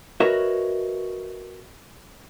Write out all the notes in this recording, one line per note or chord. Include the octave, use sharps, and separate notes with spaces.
F#4 A#4 B4 C#5 D#5 E5